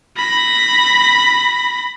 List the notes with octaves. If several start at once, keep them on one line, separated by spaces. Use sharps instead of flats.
B5 A#6